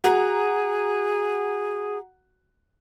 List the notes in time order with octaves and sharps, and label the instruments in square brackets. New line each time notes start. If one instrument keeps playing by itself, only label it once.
[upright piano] F#4 A#5 [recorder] G#4